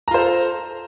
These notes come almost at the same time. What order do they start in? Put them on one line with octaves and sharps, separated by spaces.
A#5 F4 C5 A4